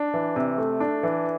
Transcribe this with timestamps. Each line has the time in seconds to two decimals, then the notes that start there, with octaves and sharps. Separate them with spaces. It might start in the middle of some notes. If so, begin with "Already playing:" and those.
Already playing: D4
0.14 E3
0.36 C3
0.58 A3
0.80 D4
1.03 E3